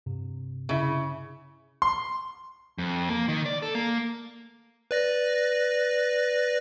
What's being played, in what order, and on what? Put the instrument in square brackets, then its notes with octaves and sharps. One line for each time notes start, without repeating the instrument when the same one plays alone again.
[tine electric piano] G2 C3
[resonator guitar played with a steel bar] C#3 [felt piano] E4 E5
[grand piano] C6
[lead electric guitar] F2
A#3
D#3
D5
A4
A#3
[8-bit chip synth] B4 D5 A#6